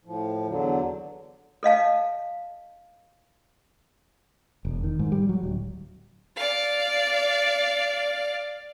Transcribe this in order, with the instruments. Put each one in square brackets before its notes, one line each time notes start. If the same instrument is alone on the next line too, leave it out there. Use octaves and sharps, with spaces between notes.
[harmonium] A2 F3
E2 D3 F#3
[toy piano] A4 D#5 F5 A5
[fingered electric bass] E1
D#3
G#2
G3
F#3
D1
[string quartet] D5 F5